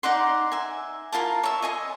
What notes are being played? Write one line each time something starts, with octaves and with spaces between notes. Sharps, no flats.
D#4 D5 F#5 C6
E5 G#5
E4 F4 A#4 A5
C#5 E5
D#5 G#5 C6